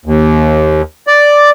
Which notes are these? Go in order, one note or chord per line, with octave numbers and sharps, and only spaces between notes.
D#2
D5